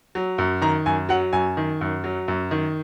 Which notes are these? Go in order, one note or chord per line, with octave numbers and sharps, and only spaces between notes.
F#3
F#2
D#3 A#5
F#2 G#5
F#3 F#5
F#2 G#5
D#3
F#2
F#3
F#2
D#3